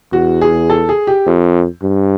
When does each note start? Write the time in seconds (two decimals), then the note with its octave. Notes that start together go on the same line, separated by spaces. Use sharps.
0.13 E2 F#4
0.42 G#4
0.70 A4
0.89 G#4
1.07 G4
1.26 F2
1.82 G2